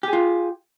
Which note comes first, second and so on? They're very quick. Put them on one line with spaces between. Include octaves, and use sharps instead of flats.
G4 G#4 F4